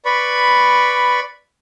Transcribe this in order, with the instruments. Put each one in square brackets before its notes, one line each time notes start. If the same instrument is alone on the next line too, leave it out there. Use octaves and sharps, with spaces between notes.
[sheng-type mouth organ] B4 D5 B5 C#6